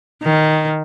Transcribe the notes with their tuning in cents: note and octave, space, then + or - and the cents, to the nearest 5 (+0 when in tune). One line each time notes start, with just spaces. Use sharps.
D#3 +0